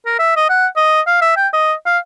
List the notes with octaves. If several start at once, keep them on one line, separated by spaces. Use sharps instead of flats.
A#4
E5
D#5
F#5
D#5
F5
E5
G5
D#5
F5